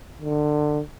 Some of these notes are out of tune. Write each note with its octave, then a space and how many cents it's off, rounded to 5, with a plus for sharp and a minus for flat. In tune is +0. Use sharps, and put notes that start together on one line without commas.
D3 +25